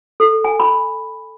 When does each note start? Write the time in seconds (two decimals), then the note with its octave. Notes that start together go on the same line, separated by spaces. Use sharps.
0.20 A4
0.44 G#5
0.60 B5